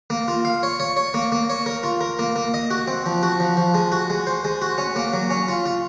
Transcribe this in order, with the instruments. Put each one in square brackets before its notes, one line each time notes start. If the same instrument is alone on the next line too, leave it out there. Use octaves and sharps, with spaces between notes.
[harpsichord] A#3
F4
F5
C#5
C#5
C#5
A#3
A#3
C#5
A#4
F4
A#4
A#3
A#3
D#5
F#4
C4
F3
F#4
F3
F3
G#3
F#4
G#3
C5
G#3
F#4
C#4
A#3
F#3
C#4
F4
F4